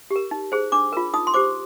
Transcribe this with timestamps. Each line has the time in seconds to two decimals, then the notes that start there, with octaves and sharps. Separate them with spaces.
0.11 G4
0.16 A#4
0.31 D#4
0.52 G#4 C5
0.72 D4 D6
0.93 F4 A#4
1.14 D#4 D#6
1.27 C6
1.34 G4 C5 D6